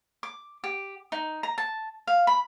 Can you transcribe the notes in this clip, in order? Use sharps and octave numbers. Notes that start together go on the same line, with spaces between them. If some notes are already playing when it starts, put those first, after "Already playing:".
D6
G4
D#4
A#5
A5
F5
B5